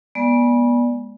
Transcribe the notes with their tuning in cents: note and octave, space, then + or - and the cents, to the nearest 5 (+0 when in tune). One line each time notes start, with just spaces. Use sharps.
G#3 -10 B3 -30 D5 +0